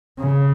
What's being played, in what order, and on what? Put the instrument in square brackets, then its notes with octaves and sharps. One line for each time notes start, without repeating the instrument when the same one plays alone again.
[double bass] C#3